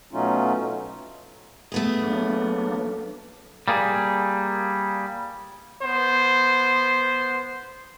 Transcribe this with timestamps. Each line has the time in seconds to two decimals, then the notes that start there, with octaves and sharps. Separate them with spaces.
0.13 B2 F#3 A3 C#4 D#4 F4
1.72 A3 B3 G#4
2.02 F#3 A#3 D4
3.68 G3 A#3 G#4
5.82 B3 C5